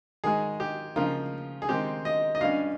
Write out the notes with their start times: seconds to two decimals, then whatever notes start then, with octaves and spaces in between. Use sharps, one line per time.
0.24 G#2 D#3 G#3 G#4
0.60 G4
0.96 C#3 F3 A#3 D#4 F4
1.62 G#4
1.69 D#3 G#3 C4 G4
2.05 D#5
2.35 D#5
2.41 G2 G3 C#4 F5